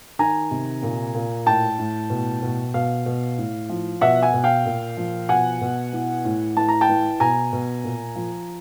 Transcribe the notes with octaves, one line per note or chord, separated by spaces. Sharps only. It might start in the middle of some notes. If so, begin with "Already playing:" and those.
D#3 G#5 A#5
C3
A#2
A#2
A2 G5 A5
A2
B2
B2
B2 F5
B2
A2
F3
B2 E5 F#5
F#5 G#5
B2
F5 G5
A#2
F3
B2 F#5 G#5
B2
E3
A2
E3 A5
A#5
G5 A5
E3
B2 G#5 A#5
B2
A#2
F3